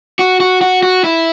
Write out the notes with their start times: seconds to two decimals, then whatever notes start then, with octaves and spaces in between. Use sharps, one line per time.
0.19 F#4
0.40 F#4
0.61 F#4
0.83 F#4
1.04 E4